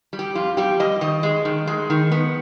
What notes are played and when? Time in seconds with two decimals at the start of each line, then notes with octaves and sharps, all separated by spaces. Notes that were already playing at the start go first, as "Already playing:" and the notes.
0.13 G3
0.19 G4
0.35 F2 F4
0.57 G3 G4
0.79 G3 D#5
1.01 D#3 D#5
1.23 G#3
1.45 D#3
1.67 G#3
1.90 D#3
2.12 B3